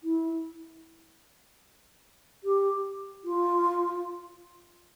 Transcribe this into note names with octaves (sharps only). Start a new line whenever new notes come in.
E4
G4
F4